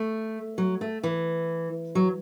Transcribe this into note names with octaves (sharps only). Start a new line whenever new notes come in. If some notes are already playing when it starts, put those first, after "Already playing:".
Already playing: A3
F#3
A3
E3
F#3